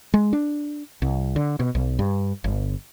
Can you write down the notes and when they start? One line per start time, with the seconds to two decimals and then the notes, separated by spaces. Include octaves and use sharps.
0.14 G#3
0.33 D4
1.02 C2
1.36 D3
1.60 B2
1.75 B1
1.99 G2
2.44 G1